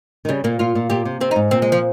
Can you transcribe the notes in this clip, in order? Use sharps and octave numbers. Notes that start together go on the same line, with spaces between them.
D#3
C#3 G3
A#2 A#3
A#2 F4
A#2
A#2 G4
C3
C3 C4
D#4
G#2
A#2 C4
G#3
F3